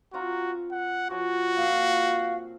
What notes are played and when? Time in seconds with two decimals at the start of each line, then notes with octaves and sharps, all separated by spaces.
0.13 C4 F4 F#4 A#5
0.71 F#5
1.10 F3 F#4 C#5
1.57 A#2 C4 F5